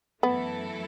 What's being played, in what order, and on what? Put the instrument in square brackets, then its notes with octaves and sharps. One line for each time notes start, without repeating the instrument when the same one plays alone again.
[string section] F#2 E3 A3 E4 A4 [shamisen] B3